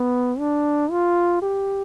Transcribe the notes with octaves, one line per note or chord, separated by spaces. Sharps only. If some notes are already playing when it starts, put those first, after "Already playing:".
Already playing: B3
D4
F4
G4